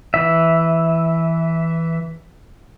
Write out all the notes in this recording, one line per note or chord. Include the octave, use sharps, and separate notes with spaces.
E3 E5